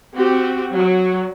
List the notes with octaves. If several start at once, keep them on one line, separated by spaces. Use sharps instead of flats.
C4 F#4 G4
F#3